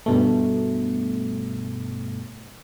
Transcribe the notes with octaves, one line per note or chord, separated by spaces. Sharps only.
G2 B2 A3